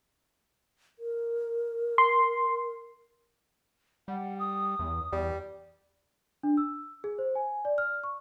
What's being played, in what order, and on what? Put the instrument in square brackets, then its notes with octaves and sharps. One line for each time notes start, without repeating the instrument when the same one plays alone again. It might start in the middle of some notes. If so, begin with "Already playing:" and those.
[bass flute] A#4
[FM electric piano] C6
[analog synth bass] G3 [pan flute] F#5
[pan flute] D#6
[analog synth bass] E2
[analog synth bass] E2 [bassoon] G3
[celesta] D4
E6
G#4
C5
G#5
D5
F6
C#6